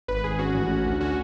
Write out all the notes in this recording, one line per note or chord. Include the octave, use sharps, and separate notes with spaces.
G#1 B4
G#1 G#4
C#4 F#4
A1
C#4
D2
C#4 F#4